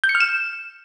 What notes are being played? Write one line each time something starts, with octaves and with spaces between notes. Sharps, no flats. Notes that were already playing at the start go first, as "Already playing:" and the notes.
G6
C#7
F6
E7